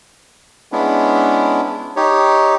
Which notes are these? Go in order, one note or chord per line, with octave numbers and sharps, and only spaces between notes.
G#3 B3 C#4 D4 E4
D#4 G4 C#5